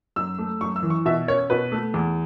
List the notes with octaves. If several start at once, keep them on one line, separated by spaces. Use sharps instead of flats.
F#2 E6
A3
F#2 C#6
E6
E3
C#6
B2 E5
C#4 C#5
B2 B4
A3
E2